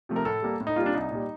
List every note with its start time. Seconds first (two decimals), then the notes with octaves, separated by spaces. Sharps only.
0.09 C3 F3 A3
0.16 A#4
0.25 A2 A4
0.42 G3 A#3
0.60 A2
0.67 D#4
0.76 G3 A#3 F4
0.86 D4
0.94 C2 D#4
1.11 A#2 G3